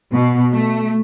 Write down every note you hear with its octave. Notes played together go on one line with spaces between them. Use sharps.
B2
A3